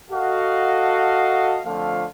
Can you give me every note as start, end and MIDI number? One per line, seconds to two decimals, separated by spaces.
0.11 1.59 66
0.11 1.59 69
0.11 1.59 75
0.11 1.59 77
1.65 2.04 41
1.65 2.04 50
1.65 2.04 53
1.65 2.04 57
1.65 2.04 77